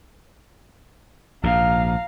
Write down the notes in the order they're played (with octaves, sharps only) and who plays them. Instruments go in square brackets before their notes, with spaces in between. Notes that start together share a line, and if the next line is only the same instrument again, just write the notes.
[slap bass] A#1 G#2 [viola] F5 A#5